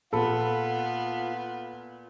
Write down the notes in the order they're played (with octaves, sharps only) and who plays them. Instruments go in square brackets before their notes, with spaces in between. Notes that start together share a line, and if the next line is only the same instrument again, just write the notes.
[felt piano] A#2 B5 [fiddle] B3 [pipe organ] F4 [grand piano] A4